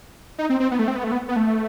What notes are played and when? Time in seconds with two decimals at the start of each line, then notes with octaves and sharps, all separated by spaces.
0.38 D#4
0.50 C4
0.60 C4
0.71 B3
0.79 A3
0.88 C4
0.96 B3
1.04 A3
1.12 B3
1.28 B3
1.36 A3